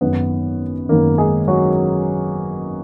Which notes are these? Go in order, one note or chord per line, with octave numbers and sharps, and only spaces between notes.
G#1 F#2 D#3 B3 B4
G#1 F#2 D#3 A#3 A#4
G#3 G#4
F#3 F#4